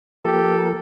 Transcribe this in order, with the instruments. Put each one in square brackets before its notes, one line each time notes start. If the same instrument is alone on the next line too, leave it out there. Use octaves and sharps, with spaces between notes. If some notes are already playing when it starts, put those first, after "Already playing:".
[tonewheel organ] F3 A#3 A#4 [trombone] G4 [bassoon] A4